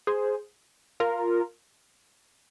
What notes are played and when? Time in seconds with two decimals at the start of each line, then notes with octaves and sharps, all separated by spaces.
0.07 G#4 C5
1.00 F4 A#4